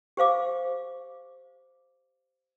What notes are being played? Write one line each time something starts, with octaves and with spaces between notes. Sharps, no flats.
G4 C5 F5 D6